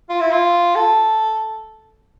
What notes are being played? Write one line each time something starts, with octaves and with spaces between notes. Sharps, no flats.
F4
E4
F4
A4